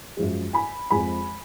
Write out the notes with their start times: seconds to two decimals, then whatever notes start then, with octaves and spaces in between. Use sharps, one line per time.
0.17 F#2 F3 G#3
0.53 G#5 B5
0.91 F2 F3 G#3 G#5 B5